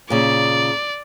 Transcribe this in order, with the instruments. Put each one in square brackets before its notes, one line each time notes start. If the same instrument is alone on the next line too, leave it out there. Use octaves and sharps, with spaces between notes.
[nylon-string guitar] A#2 C#3 [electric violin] D5